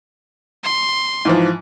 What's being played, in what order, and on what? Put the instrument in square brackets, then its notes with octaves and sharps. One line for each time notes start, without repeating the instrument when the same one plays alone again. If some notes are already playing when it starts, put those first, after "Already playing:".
[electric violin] C6
[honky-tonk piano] G#2 E3 F3